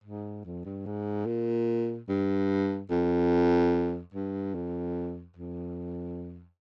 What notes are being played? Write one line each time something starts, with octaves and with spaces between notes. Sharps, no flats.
G#2
F2
G2
G#2
A#2
G2
F2
G2
F2
F2